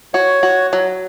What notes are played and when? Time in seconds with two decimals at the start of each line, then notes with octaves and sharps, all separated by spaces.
0.14 F#4 C#5
0.43 F#4
0.73 F#3